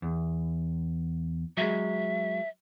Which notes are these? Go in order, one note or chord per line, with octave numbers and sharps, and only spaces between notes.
E2
F#3 G#3 E5